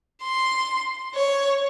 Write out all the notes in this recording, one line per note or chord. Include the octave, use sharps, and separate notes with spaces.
C6
C#5